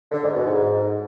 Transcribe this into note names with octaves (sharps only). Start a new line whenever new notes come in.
D3
G#2
B2
G#2